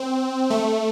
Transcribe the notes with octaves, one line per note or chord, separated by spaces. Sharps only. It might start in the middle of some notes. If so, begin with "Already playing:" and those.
Already playing: C4
A3